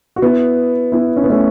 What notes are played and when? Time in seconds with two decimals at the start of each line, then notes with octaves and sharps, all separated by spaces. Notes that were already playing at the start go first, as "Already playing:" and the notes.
0.16 F#4
0.22 B3 E4
0.92 B3 E4
1.16 C#4
1.24 B3
1.30 A3 C#4